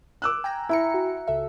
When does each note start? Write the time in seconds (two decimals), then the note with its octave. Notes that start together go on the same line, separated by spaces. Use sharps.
0.22 D6 E6 F#6
0.44 G5 G#5 A#5
0.69 E4 E5 A#5 C#7
0.94 F#4
1.27 C#2 A4 E5